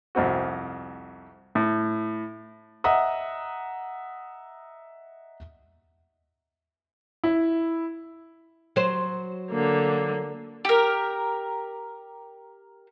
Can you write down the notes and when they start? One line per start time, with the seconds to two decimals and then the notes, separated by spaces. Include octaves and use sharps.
0.15 C2 F2 C4 F#4
1.55 A2
2.84 D#5 E5 F#5 A#5 D#6
7.24 E4
8.76 F#3 C5
9.51 D3 A#3
10.65 G4 A#4